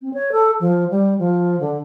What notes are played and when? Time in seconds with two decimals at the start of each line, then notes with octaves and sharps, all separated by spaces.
0.01 C4
0.13 C#5
0.31 A4
0.60 F3
0.90 G3
1.18 F3
1.59 D3